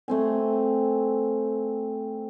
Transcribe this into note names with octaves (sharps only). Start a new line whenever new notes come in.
A3 C4 G#5